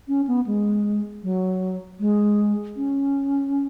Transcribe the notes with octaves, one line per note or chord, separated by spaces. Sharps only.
C#4
B3
G#3
F#3
G#3
C#4